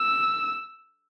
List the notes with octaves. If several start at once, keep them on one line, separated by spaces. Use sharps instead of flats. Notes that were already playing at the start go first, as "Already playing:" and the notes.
Already playing: E6